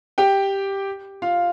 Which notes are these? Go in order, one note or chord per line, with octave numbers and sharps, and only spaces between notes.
G4 G5
F4 F5